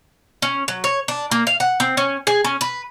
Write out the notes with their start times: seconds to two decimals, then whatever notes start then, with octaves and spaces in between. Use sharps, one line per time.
0.42 C#4
0.68 F#3
0.84 C#5
1.08 D4
1.31 A#3
1.47 F5
1.60 F#5
1.80 C4
1.97 C#4
2.27 G#4
2.44 C#4
2.61 B4